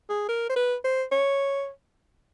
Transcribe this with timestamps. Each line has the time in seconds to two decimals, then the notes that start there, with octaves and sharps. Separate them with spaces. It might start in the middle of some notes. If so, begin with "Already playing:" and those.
0.09 G#4
0.29 A#4
0.49 C5
0.56 B4
0.84 C5
1.12 C#5